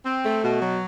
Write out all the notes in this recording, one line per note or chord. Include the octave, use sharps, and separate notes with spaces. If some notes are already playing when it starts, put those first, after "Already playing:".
C4
A3
B2
F#3